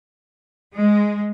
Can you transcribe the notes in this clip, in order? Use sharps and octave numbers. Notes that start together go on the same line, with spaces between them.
G#3